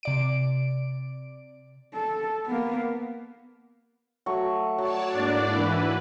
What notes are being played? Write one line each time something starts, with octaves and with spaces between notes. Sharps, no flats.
C3 D5 D7
A4
A#3 B3
F#3 A3 C#6
F#3 C#5 D5 A5
G#2 A#3 D4 E4 D5
E3 B4